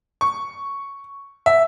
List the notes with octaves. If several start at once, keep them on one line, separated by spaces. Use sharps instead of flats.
C#6
E5